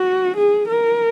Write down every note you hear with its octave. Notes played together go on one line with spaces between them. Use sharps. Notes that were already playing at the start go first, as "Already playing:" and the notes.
Already playing: F#4
G#4
A#4